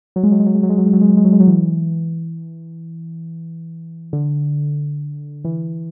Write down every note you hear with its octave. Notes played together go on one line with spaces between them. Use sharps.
F#3
G#3
F#3
G#3
F#3
G#3
F#3
G#3
F#3
G#3
F#3
G#3
F#3
G#3
F#3
G#3
F#3
E3
D3
E3